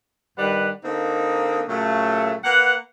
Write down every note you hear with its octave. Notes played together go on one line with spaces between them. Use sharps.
G2 D#3 G3 B4 F#5
D3 A#3 C4 D#4
A#2 C#3 F#3 A3
A#3 B4 F#5